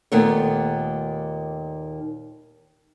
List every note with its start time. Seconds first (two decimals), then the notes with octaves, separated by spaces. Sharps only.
0.12 D#2 A#2 D#3 A3 B3 A#4